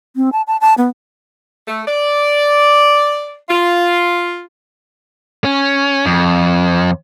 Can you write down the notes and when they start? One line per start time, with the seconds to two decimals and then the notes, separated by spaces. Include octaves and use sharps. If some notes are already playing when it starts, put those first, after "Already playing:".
0.16 C4
0.32 A5
0.47 A5
0.61 A5
0.78 B3
1.67 A3
1.87 D5
3.49 F4
5.44 C#4
6.06 F2